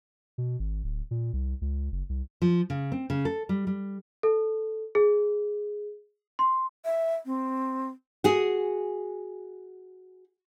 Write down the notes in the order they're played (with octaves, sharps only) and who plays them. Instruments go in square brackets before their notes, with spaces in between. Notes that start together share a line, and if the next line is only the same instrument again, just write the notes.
[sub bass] B2
G#1
D1
A#2
C2
C#2
F#1
C2
[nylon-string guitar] F3
C#3
C4
C#3
A4
G3
G3
[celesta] A4
G#4
C6
[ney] E5
C4
[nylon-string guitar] F#4 G#4